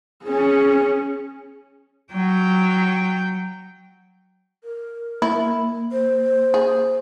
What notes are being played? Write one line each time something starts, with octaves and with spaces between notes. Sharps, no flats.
C#4 G#4
F#3 G5
A#4
A#3 E4
C5
G#4